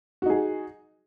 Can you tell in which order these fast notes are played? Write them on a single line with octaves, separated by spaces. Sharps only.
F#4 D#4 G#4